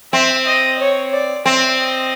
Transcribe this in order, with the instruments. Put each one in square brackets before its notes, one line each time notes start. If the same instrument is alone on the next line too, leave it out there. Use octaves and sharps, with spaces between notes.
[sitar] C4 [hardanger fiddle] E5
[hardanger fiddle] D#5
C#5
D5
[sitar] C4 [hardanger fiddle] E5
[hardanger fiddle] D#5